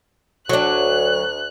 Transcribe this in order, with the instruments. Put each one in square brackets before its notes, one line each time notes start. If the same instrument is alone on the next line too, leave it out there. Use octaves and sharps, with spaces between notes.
[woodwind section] D2 [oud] F#3 D4 [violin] F#6